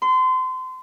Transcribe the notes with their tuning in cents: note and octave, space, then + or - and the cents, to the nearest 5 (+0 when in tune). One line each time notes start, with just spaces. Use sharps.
C6 -30